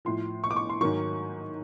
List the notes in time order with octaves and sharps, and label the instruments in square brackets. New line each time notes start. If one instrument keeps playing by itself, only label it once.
[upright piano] A2 F3 C6
C#6
D6
C#6
C6
G#2 D#3 F#3 C#6